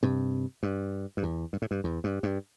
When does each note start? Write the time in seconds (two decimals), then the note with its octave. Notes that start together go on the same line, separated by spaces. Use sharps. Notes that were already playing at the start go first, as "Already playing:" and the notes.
0.03 G2 C3
0.63 G2
1.17 G2
1.23 E2
1.53 G2
1.62 A2
1.71 G2
1.84 E2
2.04 G2
2.23 G2